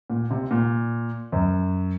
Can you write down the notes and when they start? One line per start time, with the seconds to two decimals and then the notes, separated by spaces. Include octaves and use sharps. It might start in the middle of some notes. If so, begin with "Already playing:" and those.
0.10 A#2
0.31 C3
0.51 A#2
1.32 F#2